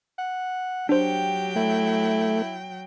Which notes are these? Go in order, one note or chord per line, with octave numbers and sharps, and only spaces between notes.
F#5
F#3 D4 G4 C5 G5
A3 E4